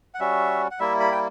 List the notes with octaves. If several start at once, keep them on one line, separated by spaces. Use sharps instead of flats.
F#5
G3 C#4 F#4 E5
F#5
G3 A#3 E4 E5
B5
G5